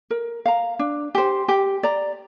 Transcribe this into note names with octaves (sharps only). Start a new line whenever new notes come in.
A#4
F5 A#5
D4
G4 C5
G4
D5 A#5